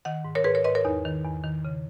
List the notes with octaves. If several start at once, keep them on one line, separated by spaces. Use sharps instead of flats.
D#3 D#5 F#5
G#2
A#4 C#5
G#2 G#4 B4
A#4 C#5
G#2 B4 D#5
A#4 C#5
E2 D#4
D#3
E2
D#3
C#3